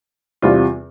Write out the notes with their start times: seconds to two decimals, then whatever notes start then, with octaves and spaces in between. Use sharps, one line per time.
0.42 E2 C3 G3 C4 F4